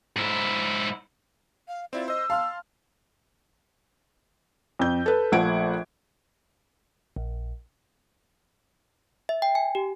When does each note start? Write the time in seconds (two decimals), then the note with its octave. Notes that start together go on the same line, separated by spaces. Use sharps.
0.16 G#2 E4
1.68 F5
1.93 C4 E4 F4 D5
2.08 C5 D#5 E6
2.30 F5 A5 C6 F6
4.79 F2 G6
5.06 A4 B4
5.32 A#1 F3 A3 F#5 G#6 D7
7.16 A#1
9.29 E5
9.42 G5
9.55 G#5
9.75 G4